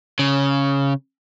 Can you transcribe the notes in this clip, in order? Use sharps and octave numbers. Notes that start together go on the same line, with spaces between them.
C#3